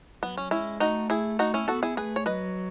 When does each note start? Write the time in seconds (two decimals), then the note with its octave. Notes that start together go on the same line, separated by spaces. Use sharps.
0.23 F#3 B3
0.37 C#4
0.51 G#3 C#4 E4
0.80 A3 D#4 F#4
1.10 E4 G#4
1.39 D#4 F#4
1.54 C#4 E4
1.68 B3 F#4 A4
1.83 E4 G#4
1.97 A3 G#4 B4
2.16 C#5
2.26 F#3 B4 D#5